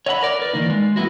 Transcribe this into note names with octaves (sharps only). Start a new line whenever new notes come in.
C#5 D#5 E5 F#5 A5 B5
A#4 D5
A#4 B4 D5
D#3 E3 A#3 D#4
G#3
F3 A3 B3 E4 F#4